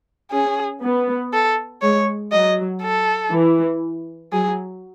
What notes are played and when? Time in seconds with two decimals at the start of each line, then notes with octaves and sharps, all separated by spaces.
0.32 C#4 G#4
0.83 B3
1.33 A4
1.82 G#3 C#5
2.32 F#3 D#5
2.82 A4
3.33 E3
4.32 F#3 G#4